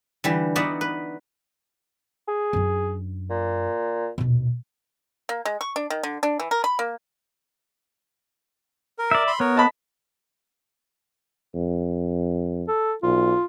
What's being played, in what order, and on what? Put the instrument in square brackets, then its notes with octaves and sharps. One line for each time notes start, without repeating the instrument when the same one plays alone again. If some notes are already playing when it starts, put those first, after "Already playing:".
[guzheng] D3 E3 G3
B3 D#4 F#4 D5 E5
B4
[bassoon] G#4
[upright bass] F#2 D4
[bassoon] A#2
[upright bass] D#1 B2
[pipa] A#3
G#3
C#6
D4
D#3
D3
D4
E3
A#4
B5
A#3
[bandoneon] A#4
[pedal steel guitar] D5 E5
[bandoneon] B5 C6
[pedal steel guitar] B3 [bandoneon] A#4 C#5
[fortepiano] D#5 A5 B5
[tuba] F2
[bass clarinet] A4
[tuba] B1 [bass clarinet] F4